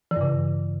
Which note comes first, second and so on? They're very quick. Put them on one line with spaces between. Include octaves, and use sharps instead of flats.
E3 G2 C#3